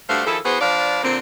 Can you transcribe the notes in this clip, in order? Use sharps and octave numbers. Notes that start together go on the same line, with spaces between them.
G2 A3 D4 F#4 C5 F5
D#3 F3 E4 G#4 A4
E3 B3 F#4 G#4 C5
F3 D4 B4 D5 F5
A#2 D3 A#3 C4